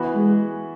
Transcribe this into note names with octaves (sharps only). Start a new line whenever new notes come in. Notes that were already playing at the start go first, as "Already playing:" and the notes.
Already playing: E3 B3 F#4
G#3